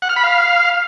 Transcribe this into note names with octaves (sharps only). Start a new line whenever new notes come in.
F#5
F6
B5
F5